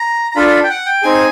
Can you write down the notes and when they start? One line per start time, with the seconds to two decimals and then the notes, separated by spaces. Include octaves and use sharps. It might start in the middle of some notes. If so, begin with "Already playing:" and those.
Already playing: A#5
0.31 A#5
0.36 D4 F4 A4 B5
0.47 B5
0.63 G5
0.70 F#5
0.86 G5
1.03 C4 D#4 G#4 G#5